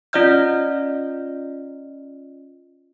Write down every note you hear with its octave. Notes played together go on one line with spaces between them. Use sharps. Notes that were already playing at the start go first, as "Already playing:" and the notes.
C#4 F4 D5 D#5 F6 G6